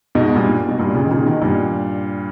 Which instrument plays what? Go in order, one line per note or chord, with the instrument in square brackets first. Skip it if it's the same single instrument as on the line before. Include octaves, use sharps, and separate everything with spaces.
[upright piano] G#2 B2
G#2
G2 A#2
B2
G2 A#2
A#2 C#3
D#3
A#2 C#3
B2 D#3
G2 A#2